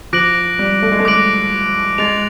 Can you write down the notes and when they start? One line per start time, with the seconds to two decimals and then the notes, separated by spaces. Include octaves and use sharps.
0.13 F3 D6 F#6 A#6 D7 F#7
0.59 G3
0.82 A3
0.92 G#3
0.99 A3
1.05 D6 F#6 A#6 D7 F#7
1.98 G#3 A6 D7 F7